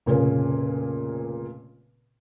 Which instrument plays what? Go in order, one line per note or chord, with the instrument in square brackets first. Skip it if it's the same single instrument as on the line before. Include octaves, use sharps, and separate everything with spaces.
[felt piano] F1 A#2 C#3 A#3 C#4